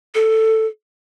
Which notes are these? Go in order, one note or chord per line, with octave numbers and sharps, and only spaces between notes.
A4